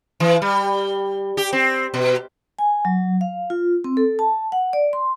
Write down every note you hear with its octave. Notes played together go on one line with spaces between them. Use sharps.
E3
G3
G4
C4
B2
G#5
F#3
F5
F4
C4
A4
A5
F#5
D5
C6